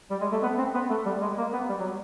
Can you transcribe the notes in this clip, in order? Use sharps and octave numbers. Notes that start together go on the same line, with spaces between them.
G3
G#3
A3
B3
C4
B3
A3
G3
G#3
A#3
B3
G3
F#3